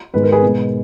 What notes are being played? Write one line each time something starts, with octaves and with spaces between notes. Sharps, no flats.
G#2 D#3 G#3 B3 B4
A#4
G#4 B4
B2 G#3 B3